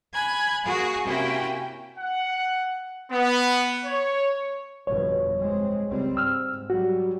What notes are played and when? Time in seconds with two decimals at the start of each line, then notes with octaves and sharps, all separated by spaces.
0.14 G#5 B5 F#6 G#6
0.65 A#3 F#4 G#4 G#5 C#6
1.06 C3 A#3 C#4 E4 F#4 G5
1.98 F#5
3.12 B3
3.85 C#5
4.87 G1 F2 B2 C#5
5.39 G#3 C4
5.88 C#2 G3 C4
6.17 G#2 E6 F6
6.70 F#3 G3 F#4